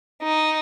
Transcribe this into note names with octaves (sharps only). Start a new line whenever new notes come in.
D#4